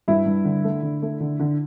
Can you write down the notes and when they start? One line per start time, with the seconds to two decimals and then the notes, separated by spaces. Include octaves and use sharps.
0.08 G2 E4
0.26 G2
0.44 D3
0.64 A3
0.82 D3
1.02 A3
1.20 D3
1.40 D3